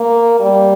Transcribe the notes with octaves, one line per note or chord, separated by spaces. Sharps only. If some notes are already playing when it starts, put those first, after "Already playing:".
Already playing: A#3
G3